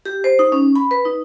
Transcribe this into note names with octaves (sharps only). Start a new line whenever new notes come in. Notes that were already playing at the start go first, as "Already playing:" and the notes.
G4
C5
D#4
C#4
B5
B4
D#4